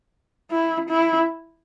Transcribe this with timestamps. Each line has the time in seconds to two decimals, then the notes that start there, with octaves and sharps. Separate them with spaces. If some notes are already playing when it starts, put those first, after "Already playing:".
0.51 E4
0.89 E4